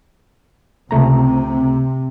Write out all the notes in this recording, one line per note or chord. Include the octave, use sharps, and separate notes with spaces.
C#2 C3 A3 A#5